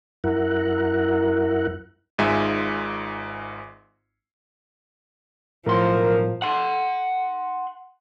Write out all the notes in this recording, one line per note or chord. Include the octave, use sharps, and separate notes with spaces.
F#2 E4 A#4 F#5
G#1 G#2 G#3 F4 E5 G#5
B1 A2 F3 A#4 C6
F#5 C6